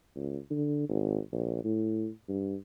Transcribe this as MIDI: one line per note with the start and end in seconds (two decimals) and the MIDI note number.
0.15 0.37 37
0.50 0.87 50
0.89 1.18 32
1.32 1.63 34
1.64 2.08 45
2.28 2.56 43